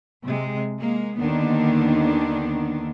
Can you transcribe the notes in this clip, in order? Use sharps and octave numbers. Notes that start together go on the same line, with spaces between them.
C3 G#3
G#3 A#3
D#2 D3 D#3 B3 D4